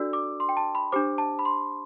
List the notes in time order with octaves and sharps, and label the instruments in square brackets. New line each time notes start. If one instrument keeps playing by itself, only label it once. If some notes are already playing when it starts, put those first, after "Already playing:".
Already playing: [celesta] D4 F#4 A4 D5 E6
D6
C6
G5
A5
B5
D4 G4 C5 D6
A5
B5
C6